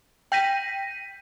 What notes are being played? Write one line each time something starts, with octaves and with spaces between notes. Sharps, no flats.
G5 G6 A#6 B6 D#7